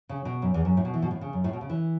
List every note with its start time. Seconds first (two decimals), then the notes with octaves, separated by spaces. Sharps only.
0.09 C#3
0.25 B2
0.42 F#2
0.54 E2
0.65 F#2
0.77 A2
0.85 B2
0.94 E3
1.02 B2
1.11 A2
1.21 C#3
1.33 F#2
1.44 A2
1.53 B2
1.61 C#3
1.70 E3